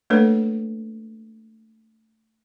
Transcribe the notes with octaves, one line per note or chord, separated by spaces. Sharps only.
A3 A#3 D4 A4 B4 C#5